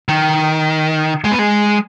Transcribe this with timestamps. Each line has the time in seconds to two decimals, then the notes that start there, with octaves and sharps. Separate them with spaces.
0.09 D#3
1.25 G#3
1.32 B3
1.39 G#3